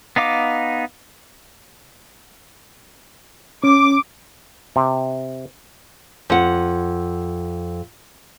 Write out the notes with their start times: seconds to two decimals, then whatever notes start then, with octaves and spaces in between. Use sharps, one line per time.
0.16 B3 D#4 F5 D6
3.64 C#4 D6
4.76 C3
6.30 F2 F#5